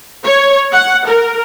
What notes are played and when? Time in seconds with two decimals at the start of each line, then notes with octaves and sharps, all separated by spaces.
0.24 C#5
0.72 F#5
1.07 A#4